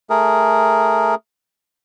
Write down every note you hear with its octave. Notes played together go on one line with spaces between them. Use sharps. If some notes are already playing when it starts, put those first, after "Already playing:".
A3 G#4 A#4